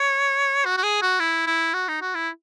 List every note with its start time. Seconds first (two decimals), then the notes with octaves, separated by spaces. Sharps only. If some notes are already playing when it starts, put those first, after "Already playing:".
Already playing: C#5
0.65 F#4
0.77 F#4
0.83 G#4
1.02 F#4
1.20 E4
1.47 E4
1.74 F#4
1.88 D#4
2.01 F#4
2.15 E4